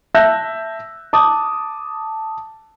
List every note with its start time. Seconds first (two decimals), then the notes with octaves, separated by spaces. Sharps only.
0.14 E5 A5 E6 F#6 G6 A#6
1.13 A5 D6 D#6